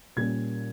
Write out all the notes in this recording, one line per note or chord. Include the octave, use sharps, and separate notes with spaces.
A#2 G3 A#3 C#4 G#6